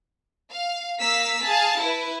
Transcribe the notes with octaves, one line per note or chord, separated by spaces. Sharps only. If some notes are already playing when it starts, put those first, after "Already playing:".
F5
A#3 F5 E6 B6
G#4 F5 A5
E4 B4